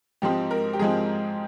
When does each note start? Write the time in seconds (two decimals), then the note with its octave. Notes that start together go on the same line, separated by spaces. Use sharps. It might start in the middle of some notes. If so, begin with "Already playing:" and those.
0.22 G#2 F3 G#3 C4 G4
0.51 A#4
0.73 G4
0.79 G#2 F3 G#3 C4 G#4